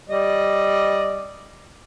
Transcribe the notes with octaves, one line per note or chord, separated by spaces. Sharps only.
G3 D5 D#5